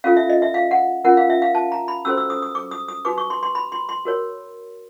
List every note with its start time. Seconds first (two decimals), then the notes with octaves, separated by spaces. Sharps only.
0.04 C#4 F4 A4 F5
0.17 E5
0.30 D#5
0.42 E5
0.54 F5
0.71 F#5
1.04 C#4 F4 A#4 F#5
1.17 F5
1.30 E5
1.42 F5
1.55 A5
1.72 A#5
1.88 B5
2.05 C#4 F#4 A4 C5 E6
2.18 E6
2.30 D#6
2.42 D#6
2.55 D6
2.71 D#6
2.88 D#6
3.05 D#4 F#4 B4 D6
3.18 C#6
3.30 C6
3.43 C6
3.55 B5
3.72 C6
3.89 C6
4.05 F#4 A#4 C#5